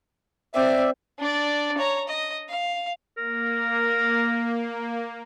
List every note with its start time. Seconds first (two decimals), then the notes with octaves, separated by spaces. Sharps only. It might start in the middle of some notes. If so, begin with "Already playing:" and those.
0.55 C4 D5 E5
1.19 D4 D5
1.77 C#5 A#5
2.08 D#5
2.49 F5
3.17 A#3 A#4